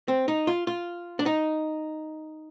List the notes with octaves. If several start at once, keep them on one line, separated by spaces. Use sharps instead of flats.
C4
D#4
F4
F4
D4
D#4